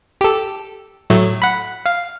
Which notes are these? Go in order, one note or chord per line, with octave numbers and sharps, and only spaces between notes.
G4 A4
A2 F#3 A3
F#5 B5
F5